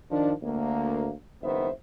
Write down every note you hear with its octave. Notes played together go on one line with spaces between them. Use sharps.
D#3 F3 D4
D2 A#3
F#1 D#3 B3 C5 E5